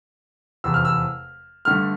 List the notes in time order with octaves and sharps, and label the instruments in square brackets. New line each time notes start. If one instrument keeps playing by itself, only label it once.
[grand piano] F1 E2 C3 E6
F6
E6
G2 D3 A3 F6